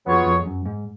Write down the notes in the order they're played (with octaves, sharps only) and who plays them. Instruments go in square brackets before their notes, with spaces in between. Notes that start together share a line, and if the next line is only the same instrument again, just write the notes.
[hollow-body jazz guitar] F2 [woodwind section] F#3 B3 F4 G#4 C#5
[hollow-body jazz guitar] F2
F#2
G#2